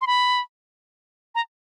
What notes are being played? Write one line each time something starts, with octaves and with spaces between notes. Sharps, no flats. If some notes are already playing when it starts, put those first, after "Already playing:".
C6
B5
A#5